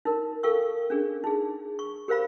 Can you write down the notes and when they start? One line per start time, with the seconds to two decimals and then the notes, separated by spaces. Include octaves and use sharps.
0.05 D#4 A#4
0.43 A4 A#4 F5 G5 C#6 E6
0.90 C#4 D4 G#4
1.24 D#4 G#4
1.79 C#6
2.08 G4 A#4 C5 F5 B5